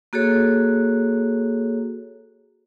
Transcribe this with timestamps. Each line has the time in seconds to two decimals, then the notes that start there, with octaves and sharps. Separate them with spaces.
0.13 A#3 F#4 G#4 A4 C#5